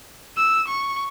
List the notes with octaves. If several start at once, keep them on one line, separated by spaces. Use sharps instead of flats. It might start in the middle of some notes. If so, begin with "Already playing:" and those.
E6
C#6